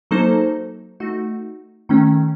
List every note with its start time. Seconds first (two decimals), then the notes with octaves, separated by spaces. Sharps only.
0.11 F#3 A#3 D#4 A4 C5
1.00 A3 D#4 F#4
1.89 D#3 A3 C#4